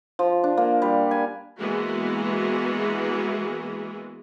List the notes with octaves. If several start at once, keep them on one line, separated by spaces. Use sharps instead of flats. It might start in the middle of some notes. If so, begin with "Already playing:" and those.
F3
D4
A#3
G3
G#5
E3 G#3 A#3 B3 F#4 G#4